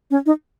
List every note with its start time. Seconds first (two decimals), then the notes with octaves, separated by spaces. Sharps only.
0.11 C#4
0.26 D#4